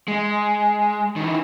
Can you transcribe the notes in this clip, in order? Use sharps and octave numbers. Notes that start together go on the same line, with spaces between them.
G#3
D#3 E3